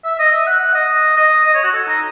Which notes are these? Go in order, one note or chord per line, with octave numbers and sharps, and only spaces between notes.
E5
D#5
E5
F#5
F#5
D#5
D#5
D#5
C#5
F#4
A4
D#4